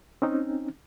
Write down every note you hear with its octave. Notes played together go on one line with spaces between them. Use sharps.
C4 C#4 D#4